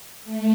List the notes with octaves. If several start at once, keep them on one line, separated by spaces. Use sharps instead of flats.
A3